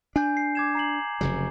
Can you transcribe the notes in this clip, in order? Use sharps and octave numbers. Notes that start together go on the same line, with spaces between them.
D4 G#5 G6
C7
D6 G#6 E7
A#5 C7 F#7
F1 C#3 F#3